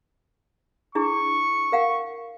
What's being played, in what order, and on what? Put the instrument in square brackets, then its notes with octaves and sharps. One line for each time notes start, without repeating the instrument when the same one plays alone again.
[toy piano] D4 E4 G#4 [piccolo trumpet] C#6
[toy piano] A#4 F5 F#5